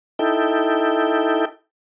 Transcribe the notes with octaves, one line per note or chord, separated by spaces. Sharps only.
D#4 E4 A4 G5